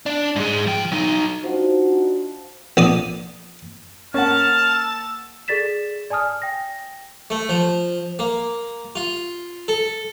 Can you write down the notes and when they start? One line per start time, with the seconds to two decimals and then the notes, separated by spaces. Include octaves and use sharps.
0.06 D4
0.36 G#2 G#3
0.67 F3 G5
0.92 F#3 D#4
1.44 F3 D4 D#4 F#4 F5 F#5
2.77 A#1 D5 D#6
4.14 A#3 C#4 F#5 A5 F6
4.70 E6
5.48 G#4 A4 D5 A6 B6 E7
6.10 D5 G#5 A5 D#6 F6
6.42 G5 A#6
7.30 A3
7.49 F3
8.19 A#3
8.95 F4
9.68 A4